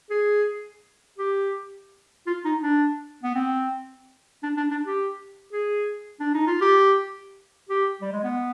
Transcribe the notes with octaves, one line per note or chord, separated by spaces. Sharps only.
G#4
G4
F4
D#4
D4
B3
C4
D4
D4
D4
G4
G#4
D4
D#4
F4
G4
G4
G3
G#3
B3